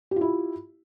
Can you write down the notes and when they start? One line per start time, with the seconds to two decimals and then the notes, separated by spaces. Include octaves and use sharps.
0.11 G4
0.16 F4
0.21 E4